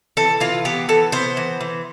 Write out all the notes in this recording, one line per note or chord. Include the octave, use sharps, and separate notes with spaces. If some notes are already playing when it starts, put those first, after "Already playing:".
E3 A4
E3 F4
B3 G4
E3 A4
B3 C5
E3
E3